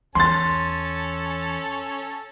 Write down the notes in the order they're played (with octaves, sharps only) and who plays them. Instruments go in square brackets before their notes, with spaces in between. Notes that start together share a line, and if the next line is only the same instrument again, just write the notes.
[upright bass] E2 [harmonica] C#4 A4 A5 [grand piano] C6 A6